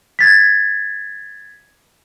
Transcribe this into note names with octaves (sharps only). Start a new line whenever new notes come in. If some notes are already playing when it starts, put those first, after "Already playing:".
G#6 A6 B6